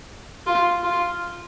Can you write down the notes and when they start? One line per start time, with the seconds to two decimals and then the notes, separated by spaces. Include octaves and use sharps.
0.46 F4
0.83 F4